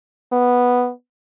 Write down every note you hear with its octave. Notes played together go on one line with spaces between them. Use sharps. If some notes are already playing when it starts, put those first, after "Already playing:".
B3